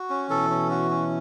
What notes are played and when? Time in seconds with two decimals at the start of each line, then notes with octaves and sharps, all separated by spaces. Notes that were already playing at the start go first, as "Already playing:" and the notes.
Already playing: F#4
0.10 C#4
0.30 B2 E3 A4
0.50 C#4
0.71 F#4
0.91 C#4